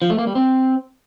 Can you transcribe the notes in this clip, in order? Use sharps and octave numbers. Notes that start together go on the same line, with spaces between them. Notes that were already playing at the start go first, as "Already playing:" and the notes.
F3
A3
A#3
G3
C4